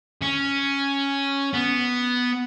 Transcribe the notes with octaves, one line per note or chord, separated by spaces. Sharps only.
C#4
B3